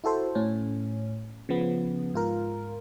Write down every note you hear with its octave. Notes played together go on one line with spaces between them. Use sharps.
E4 F#4 A4 C5
A2 C#4
C#3 F3 B3
G#2 F4 A#4